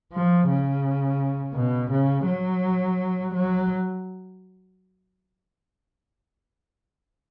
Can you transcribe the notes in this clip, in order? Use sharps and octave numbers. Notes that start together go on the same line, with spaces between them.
F3
C#3
B2
C#3
F#3
F#3